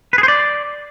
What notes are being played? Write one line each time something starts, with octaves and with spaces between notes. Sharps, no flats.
B4
G#4
C5
D5